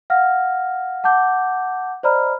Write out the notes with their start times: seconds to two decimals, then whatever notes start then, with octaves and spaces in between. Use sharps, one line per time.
0.10 F5 F#5 F6 A#6
1.04 F#5 A5 D6 G6
2.03 C5 D5 D#5 A#5 B5 F6